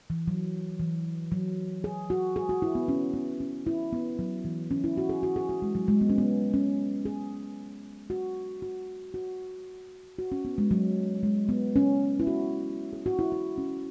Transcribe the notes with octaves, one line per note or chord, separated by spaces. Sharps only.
E3
F#3
E3
F#3
G#4
F#4
G#4
F#4
E4
B3
C#4
B3
C#4
E4
B3
F#3
E3
C#4
E4
F#4
G#4
F#4
G#4
F#4
G#3
F#3
G#3
B3
C#4
B3
C#4
G#4
F#4
F#4
F#4
F#4
C#4
B3
G#3
F#3
G#3
B3
C#4
E4
F#4
G#4
F#4
E4
E4
C#4